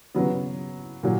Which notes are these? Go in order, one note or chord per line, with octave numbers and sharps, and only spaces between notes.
C#3 F#3 B3
A#2 F#3